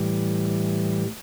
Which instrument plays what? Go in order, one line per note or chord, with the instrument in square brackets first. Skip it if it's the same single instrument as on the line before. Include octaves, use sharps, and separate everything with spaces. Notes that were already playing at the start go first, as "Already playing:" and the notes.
Already playing: [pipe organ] A2 E3 G3